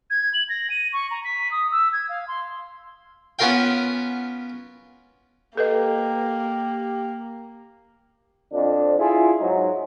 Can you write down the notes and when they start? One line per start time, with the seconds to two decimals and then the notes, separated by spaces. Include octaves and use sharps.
0.10 G#6
0.34 F#7
0.49 A#6
0.70 D#7
0.93 C#6
1.11 A#5
1.24 B6
1.51 D#6
1.72 E6
1.93 G#6
2.09 F5
2.28 C6
3.39 B3 C#4 F4 A#4 F5 G5
5.57 A#3 G4 A4 B4 D#5
8.53 F2 D4
9.00 E4 F4 G#4
9.39 G#2 F#3 D#4